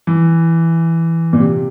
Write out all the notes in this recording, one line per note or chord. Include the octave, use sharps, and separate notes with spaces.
E3
A#2
C3